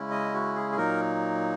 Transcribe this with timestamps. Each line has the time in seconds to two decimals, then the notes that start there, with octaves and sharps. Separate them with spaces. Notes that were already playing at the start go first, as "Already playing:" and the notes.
Already playing: C#3 G#3 C#4 E4
0.11 D#5
0.34 F#4
0.56 G#4
0.72 G#4
0.77 A#2 F#3 A#3 D#4 A#4